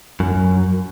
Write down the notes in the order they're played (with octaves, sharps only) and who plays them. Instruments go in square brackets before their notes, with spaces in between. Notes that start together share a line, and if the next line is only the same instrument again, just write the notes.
[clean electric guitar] F#2